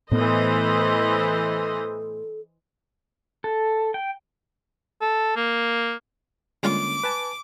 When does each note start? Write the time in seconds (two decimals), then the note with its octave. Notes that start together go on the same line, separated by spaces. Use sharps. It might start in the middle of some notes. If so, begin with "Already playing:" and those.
0.12 A2 E3 B3 A4 C5 D#5
3.44 A4
3.94 G5
5.01 A4
5.36 A#3
6.63 D3 G3 G#3 A#3 C#4 F4 D6
7.04 B4 G#5 A5